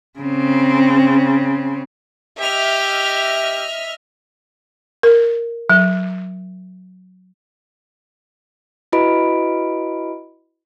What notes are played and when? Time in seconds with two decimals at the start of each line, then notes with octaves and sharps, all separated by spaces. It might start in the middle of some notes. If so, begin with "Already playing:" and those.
0.19 C#3 C4
2.40 G4 D#5 E5 F6
5.03 A#4
5.70 F#3
8.92 E4 F#4 B4 D#5 B5 D7